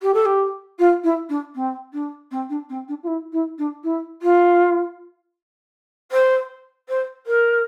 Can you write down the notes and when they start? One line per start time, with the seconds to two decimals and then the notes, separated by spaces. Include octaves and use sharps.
0.02 G4
0.14 A4
0.25 G4
0.79 F4
1.03 E4
1.29 D4
1.55 C4
1.93 D4
2.31 C4
2.49 D4
2.69 C4
2.88 D4
3.03 F4
3.07 E4
3.32 E4
3.58 D4
3.83 E4
4.22 F4
6.11 C5
6.89 C5
7.26 A#4